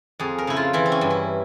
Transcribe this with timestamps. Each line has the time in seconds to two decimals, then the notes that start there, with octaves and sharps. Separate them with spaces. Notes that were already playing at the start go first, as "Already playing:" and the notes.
0.19 F2 G#4
0.38 A#4
0.47 C#3 E4
0.56 F4
0.73 E3 E4
0.86 C4
0.92 C#4
1.01 G2
1.10 E4